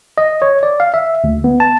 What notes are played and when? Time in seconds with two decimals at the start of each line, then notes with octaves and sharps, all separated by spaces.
0.18 D#5
0.42 C#5
0.63 D5
0.80 F5
0.94 E5
1.24 D2
1.44 B3
1.60 A5